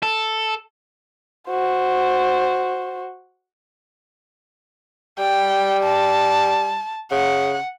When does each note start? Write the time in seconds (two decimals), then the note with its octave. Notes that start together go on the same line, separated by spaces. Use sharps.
0.03 A4
1.49 F#4 C5
5.19 G3 G5
5.83 A5
7.11 C#3 F#5